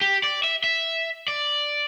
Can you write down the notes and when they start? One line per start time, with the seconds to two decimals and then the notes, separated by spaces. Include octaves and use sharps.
0.01 G4
0.24 D5
0.44 E5
0.64 E5
1.28 D5